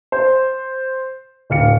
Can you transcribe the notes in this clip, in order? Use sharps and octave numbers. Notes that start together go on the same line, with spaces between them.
C5
D1 F5 C#7